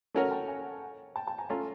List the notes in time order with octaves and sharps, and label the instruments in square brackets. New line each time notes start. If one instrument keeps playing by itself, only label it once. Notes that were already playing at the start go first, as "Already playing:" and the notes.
[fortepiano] A3 C#4 F#4 A#4 C#5 [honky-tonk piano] F#5 G#5
[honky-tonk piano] G5 A5
F#5 G#5
G5 A5
G5 A5
G#5 A#5
[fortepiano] A3 C#4 F4 [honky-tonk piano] G#5 A#5